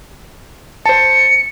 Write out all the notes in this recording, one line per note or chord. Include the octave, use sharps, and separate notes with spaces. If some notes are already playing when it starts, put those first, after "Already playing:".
C5 A5 C#7